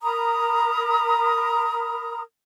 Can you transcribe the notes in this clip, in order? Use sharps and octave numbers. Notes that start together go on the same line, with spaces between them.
A#4 A#5 B5 D#6